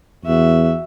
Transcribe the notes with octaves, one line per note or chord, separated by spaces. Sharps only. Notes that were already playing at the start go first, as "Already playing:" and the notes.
E2 F#4 E5